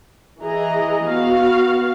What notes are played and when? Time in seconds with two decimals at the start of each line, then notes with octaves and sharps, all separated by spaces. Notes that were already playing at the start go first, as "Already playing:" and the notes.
0.41 E3 G#4 D#5 A#5
1.05 B3 F#4 F5